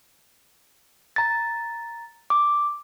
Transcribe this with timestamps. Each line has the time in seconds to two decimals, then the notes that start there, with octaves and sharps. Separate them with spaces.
1.16 A#5 A6
2.30 D6